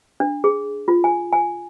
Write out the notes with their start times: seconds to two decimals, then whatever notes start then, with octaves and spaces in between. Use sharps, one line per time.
0.20 D4
0.44 G#4
0.88 F4
1.04 G#5
1.33 G#5